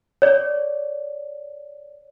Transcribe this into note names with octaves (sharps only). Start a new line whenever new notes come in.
C#5 D5